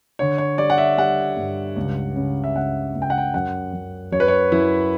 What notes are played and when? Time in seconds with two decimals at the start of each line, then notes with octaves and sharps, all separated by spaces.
0.19 D3 C#5
0.38 C#5
0.58 G3 D5
0.70 F#5
0.78 E5
0.98 G3 F#5
1.37 G2
1.76 C#2
2.16 C#3
2.44 E5
2.55 C#2 F#5
2.95 C#2
3.02 G5
3.10 F#5
3.18 G5
3.34 F#2 F#5
3.73 F#2
4.12 F#2 C#5
4.20 B4
4.28 C#5
4.52 F#2 E4